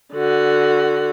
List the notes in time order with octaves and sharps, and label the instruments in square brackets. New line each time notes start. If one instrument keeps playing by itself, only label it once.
[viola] D3 F#4